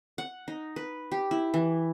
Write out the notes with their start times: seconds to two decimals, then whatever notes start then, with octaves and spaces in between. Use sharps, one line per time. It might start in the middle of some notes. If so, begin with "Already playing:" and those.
0.18 F#5
0.48 D#4
0.76 B4
1.12 G4
1.31 E4
1.54 E3